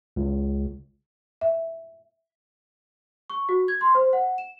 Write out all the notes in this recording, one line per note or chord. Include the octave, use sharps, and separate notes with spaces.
C#2
E5
C#6
F#4
G#6
C6
C5
F#5
E7